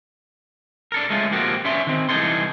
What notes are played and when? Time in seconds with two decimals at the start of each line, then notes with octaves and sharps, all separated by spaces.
0.92 D4 A4 A#4
1.10 G#3 A3 C#4 F4
1.32 F3 A#3 C4 F#4 G4
1.65 B3 C#4 D4 E5 C6
1.87 D#3 C4
2.09 C2 E3 D#4 G#4 A4 C6